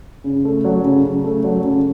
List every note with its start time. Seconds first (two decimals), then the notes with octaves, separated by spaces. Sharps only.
0.24 C#3
0.45 A3
0.64 F#3
0.84 C#3
1.04 C#3
1.24 A3
1.44 F#3
1.64 C#3